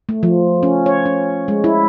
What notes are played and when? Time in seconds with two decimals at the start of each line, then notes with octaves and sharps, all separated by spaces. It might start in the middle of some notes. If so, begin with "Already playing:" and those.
0.09 A3
0.23 F3
0.63 C#4
0.86 C#5
1.06 C#4
1.48 G#3
1.64 E4